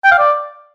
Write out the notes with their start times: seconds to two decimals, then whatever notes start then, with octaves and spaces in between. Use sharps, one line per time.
0.04 G5
0.11 F5
0.18 D5